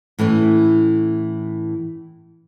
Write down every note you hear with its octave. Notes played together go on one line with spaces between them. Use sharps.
A2 E3 A3 C#4